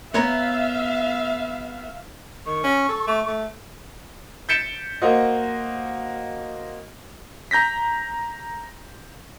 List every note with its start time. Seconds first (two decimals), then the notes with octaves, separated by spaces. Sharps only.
0.14 B3 C#5 E5 F5 A#5
2.46 D#3 C#6
2.64 C#4
2.89 A4
3.07 A3
3.27 A3
4.49 G6 A6 B6 C#7 D7 E7
5.02 A#3 F#4 C5 D#5
7.51 A#5 G6 A#6 B6